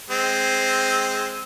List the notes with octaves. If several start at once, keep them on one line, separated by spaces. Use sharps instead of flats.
G#3 C4